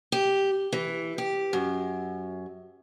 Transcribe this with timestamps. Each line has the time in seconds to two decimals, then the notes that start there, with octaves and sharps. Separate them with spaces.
0.12 G4
0.73 E3
1.18 G4
1.53 F#2